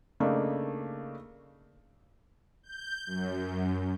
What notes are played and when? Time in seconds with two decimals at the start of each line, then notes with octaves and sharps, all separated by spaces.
0.20 C#3 A3 A#3 D4 D#4
2.63 G6
3.07 F#2